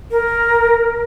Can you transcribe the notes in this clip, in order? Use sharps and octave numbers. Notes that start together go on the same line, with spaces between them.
A#4